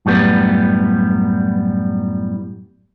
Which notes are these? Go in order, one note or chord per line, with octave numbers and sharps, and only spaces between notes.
F#2 A2 G3 B3